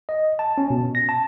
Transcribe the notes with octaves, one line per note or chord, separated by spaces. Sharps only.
D#5
A5
C#4
B2
A#6
A5